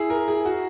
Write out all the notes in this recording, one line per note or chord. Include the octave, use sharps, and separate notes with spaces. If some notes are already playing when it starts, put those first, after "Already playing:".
Already playing: E4 G#4
A#4
G#4
F#4